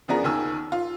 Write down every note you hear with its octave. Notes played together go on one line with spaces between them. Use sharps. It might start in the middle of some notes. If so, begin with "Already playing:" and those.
F#2 F3 B3 D4 G#4 A#4
D#2 D#3 G#5 E6
F4